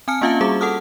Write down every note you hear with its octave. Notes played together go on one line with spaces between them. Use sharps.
C4 G#5 A5 F6 C#7
A#3 C#4 F4 E5 F5 A5
G3 F#4 G#4 D6
A4 F#5 A5 D#6 F6